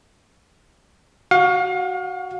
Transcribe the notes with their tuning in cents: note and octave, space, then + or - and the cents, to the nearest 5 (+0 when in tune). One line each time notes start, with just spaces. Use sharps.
F#4 +10 F5 +35